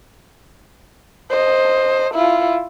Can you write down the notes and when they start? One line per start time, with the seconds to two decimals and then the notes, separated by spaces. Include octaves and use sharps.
1.30 C5 D#5
2.14 E4 F4